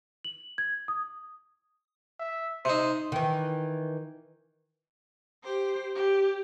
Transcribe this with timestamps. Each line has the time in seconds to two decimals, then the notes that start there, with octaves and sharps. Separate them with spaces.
0.24 F#7
0.58 G#6
0.88 D#6
2.19 E5
2.65 C3 D#4 C5
3.12 D#3 E3
5.43 G4 C5
5.95 G4